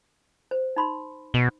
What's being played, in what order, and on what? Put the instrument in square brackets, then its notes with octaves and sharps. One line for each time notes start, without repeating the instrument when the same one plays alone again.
[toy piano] C5
D#4 B5 C6
[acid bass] B2